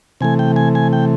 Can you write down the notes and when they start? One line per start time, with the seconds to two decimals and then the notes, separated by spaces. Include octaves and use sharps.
0.21 C3 E3 A3 G#5
0.39 G5
0.56 G#5
0.75 G#5
0.93 G5